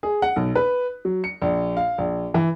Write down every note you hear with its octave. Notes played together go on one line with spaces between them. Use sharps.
G#4
F#5
B1
B4
F#3
C#7
A#1
F5
A#1
E3